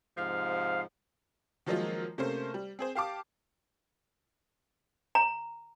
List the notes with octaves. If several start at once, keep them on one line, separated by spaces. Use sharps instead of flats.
G#2 C3 F3 F5
D#3 F3 F#3 G#3 A#3 F4
C3 A3 A#3 C#4 C5
G3
C4 G#4 C5
G4 F5 A5 D6
A#5